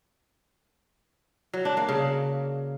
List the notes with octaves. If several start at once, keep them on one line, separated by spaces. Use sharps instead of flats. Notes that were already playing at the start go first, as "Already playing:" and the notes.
F#3
D4
A#3
C#3